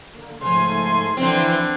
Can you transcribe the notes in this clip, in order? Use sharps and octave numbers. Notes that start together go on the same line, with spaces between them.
D3 A#3
G#2 C#3 F3 A3 G#5 C6
D3 E3 F3 C4 E4 G5